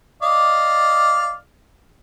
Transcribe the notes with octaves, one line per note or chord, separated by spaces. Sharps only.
D5 D#5 F5